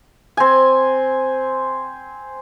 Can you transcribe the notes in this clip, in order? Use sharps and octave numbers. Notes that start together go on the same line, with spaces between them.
C4 G#5